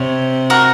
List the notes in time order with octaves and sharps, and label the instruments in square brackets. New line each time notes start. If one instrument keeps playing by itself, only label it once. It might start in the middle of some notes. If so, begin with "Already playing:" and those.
Already playing: [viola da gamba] C3 [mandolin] C#5
[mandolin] F#4 A#4